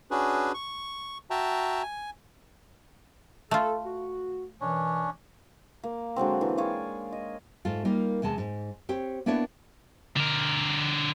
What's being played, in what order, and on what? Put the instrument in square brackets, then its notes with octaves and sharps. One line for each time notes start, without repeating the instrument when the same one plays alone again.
[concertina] C#4 D4 F#4 G#4 B4
C#6
F#4 E5 G5 A5 A#5
G#5
[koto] A3 F4 [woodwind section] A4
[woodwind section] F#4
[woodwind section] F#2 B2 E3 [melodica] C#4 D4 C#5
[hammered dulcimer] A#3
D3 F#3 G#3 C4
E3
G#4 C#5 D5 F5
D#5
[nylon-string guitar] G#2 A3 F4
G3 A#3 D#4 F4
E2 C3 G#3 A5
G#2
C4 G4 C#5
A#3 B3 D4 E4 B4 C#5
[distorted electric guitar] D3 A#4